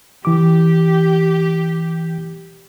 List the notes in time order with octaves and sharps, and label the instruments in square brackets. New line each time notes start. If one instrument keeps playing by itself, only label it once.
[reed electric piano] E3 D6 [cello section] G4